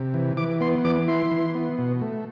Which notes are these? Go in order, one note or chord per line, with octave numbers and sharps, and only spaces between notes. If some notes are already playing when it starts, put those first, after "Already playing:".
Already playing: C3
E3
E3 D6
B3 C6
E3 D6
E4 C6
E3
B3
B2
A3